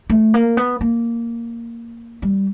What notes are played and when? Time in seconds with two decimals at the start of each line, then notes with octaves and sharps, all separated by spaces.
0.10 A3
0.34 A#3
0.57 B3
0.81 A#3
2.22 G3